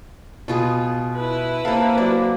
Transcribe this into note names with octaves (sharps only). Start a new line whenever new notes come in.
B2 B3 F4 G#4
E4 B4
A2 C3 A#3 A4 A#4 F5
F#3 D5